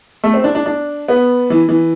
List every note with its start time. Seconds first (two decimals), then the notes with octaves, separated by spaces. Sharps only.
0.24 A3
0.34 C4
0.44 D4
0.55 D4
0.66 D4
1.08 B3
1.50 E3
1.69 E3